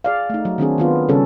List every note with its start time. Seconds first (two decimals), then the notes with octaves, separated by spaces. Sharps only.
0.04 G#4 D5 F5
0.30 A3 D#4
0.45 F#3
0.58 D#3 C4 D4 G#4
0.78 D#3 B3 F4
1.09 C#3 G3 C#4 A4